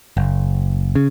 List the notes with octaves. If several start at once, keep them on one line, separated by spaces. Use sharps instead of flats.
F#1
C#3